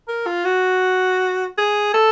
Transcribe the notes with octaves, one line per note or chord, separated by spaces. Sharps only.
A#4
F4
F#4
G#4
A4